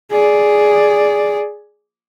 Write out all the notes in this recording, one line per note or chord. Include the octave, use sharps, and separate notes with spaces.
G#4 D5